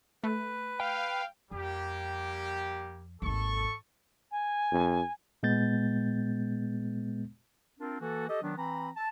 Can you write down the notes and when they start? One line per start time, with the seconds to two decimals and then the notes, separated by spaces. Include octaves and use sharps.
0.24 A3 B4
0.80 F5 G5
1.51 F2 G3 A#3 G4
3.22 G#1 D#2 A4 C#6
4.31 G#5
4.72 F2
5.43 A#2 G#3 B3 G6 A6
7.80 C4 D4 F4 A#4
8.00 E3 A#3 F#4 A4
8.29 G4 A4 D#5
8.42 D#3 F#3 B3 D4
8.57 E3 C4 A#5 B5
8.97 A5